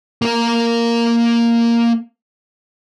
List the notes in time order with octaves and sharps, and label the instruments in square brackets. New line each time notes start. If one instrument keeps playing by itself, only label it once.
[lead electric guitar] A#3 A#4